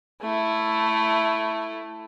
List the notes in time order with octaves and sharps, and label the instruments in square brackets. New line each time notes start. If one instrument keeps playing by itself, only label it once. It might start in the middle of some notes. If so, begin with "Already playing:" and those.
[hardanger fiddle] A3 E4